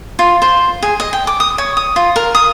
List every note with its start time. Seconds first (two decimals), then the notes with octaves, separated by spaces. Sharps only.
0.19 F4
0.42 C5
0.82 G#4
1.00 D#5
1.13 G5
1.27 D6
1.40 D#6
1.58 C#5
1.77 D#6
1.96 F4
2.16 A#4
2.35 D#6